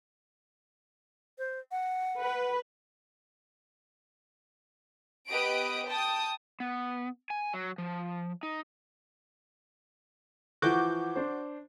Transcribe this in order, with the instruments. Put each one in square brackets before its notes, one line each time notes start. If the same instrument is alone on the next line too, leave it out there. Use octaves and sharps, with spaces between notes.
[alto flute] C5
F#5
[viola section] B4
[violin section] B3 G4 B4 D#5 D#6 D7
G5 A5 D#6
[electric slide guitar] B3
G#5
F#3
F3
D#4
[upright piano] E3 F3 [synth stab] F#4 D6 G6
[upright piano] D4 C5